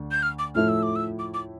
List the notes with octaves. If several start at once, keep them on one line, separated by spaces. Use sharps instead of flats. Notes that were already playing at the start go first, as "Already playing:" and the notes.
Already playing: D2 D4
G6
F6
D6
A2 F3 A3 E4 F6
E6
D6
E6
D6
D6